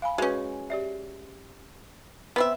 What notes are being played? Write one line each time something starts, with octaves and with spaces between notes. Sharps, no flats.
F5 G#5 B5
G#3 C#4 F#4 B4
G4 D5 E5
B3 C4 E5 B5